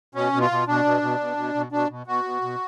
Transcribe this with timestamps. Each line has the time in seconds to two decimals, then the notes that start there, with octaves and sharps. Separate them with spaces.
0.15 B2 C#4
0.33 B2
0.41 F4
0.50 B2
0.67 B2 D4
0.85 B2
1.02 B2
1.20 B2
1.37 B2
1.54 B2
1.72 B2 D4
1.90 B2
2.06 B2 F#4
2.24 B2
2.42 B2